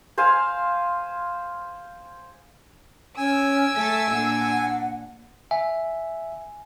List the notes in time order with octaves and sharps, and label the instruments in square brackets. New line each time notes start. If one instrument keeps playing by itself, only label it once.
[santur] C5 F5 G#5
[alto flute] C#4 [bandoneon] G#5 [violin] E6 D7
[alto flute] A3 [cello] A4 E5
[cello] A#2 D4 [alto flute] F#5
[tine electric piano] E5 [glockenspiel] G#5